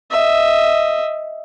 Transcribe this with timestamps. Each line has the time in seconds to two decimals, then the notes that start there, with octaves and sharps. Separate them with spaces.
0.11 D#5 E5